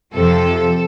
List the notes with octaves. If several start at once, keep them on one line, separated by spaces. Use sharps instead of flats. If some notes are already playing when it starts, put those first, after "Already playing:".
F2 C3 F3 A4